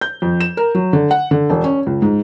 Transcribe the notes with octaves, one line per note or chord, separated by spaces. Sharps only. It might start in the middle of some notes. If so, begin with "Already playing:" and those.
G6
F2
E7
A#4
F#3
D3
F#5
D3
E1
C#4
C#2
G#2